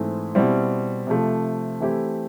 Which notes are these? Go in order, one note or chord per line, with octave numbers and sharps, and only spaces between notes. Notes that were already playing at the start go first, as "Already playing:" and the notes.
Already playing: G#2 E3 A3 C4
B2 G3 C4 E4
C3 F3 A3
E3 A3 C4 E4 G4